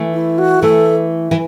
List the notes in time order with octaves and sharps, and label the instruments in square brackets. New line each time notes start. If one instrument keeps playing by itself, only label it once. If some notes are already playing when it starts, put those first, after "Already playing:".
Already playing: [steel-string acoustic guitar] E3 A3
[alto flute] E4
F#4
[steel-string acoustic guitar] E3 A3 [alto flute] A4
[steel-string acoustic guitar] E3